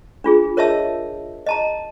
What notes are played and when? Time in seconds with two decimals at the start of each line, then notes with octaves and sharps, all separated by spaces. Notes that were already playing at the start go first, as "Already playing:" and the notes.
0.24 D4 F4 G#4
0.57 A#4 C#5 D#5 E5 A5 E6
1.46 D#5 A5 A#5